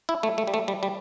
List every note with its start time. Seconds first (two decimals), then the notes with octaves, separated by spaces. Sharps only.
0.09 E4
0.23 A3
0.38 A3
0.47 G3
0.54 A3
0.68 G3
0.83 G3